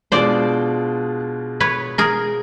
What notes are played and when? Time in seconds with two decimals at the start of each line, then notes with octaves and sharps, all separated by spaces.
0.12 B2 G#3 B3 D4 F4 C5 D5
1.60 B4 C#5
1.98 G#4 A#4